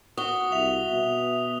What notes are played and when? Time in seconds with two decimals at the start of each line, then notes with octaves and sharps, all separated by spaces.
0.18 F#4 D#6 G7
0.52 C2 E5 F7
0.91 B2